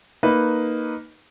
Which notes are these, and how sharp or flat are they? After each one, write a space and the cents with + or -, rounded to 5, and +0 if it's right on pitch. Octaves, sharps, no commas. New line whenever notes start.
A#3 +0 D#4 +0 B4 +0